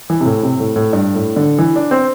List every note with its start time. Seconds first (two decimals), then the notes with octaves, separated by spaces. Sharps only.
0.10 E3
0.21 C3
0.26 A2
0.43 C3
0.60 A2
0.76 A2
0.93 G2
1.15 A2
1.36 D3
1.58 E3
1.76 D4
1.91 C4